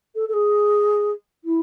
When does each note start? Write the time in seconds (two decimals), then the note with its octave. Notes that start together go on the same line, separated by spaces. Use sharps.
0.15 A4
0.28 A4
0.33 G#4
1.44 E4